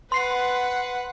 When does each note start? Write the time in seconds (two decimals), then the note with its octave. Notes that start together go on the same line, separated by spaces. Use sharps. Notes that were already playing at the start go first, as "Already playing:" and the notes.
0.12 B4 F#5 C6 C7